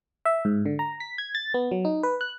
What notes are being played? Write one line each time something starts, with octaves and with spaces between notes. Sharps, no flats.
E5
G#2
D3
A#5
B6
G#6
A6
B3
F#3
D#4
B4
F#6